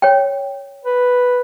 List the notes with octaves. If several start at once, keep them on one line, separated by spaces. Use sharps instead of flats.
C#5 G5
B4